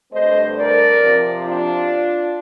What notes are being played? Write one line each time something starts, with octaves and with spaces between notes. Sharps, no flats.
G2 D3 A3 C4 C5 D#5
A#4 D5
C3 F3 C4
D4 F4